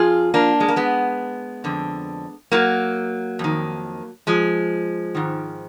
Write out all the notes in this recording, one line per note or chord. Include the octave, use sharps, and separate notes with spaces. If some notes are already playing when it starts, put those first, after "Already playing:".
Already playing: F2 F4 G#4
A#3 D4
G#3
A#3
G#3 B3
F2 D3
F#3 A#3
F2 D#3
F3 G#3
G#2 D#3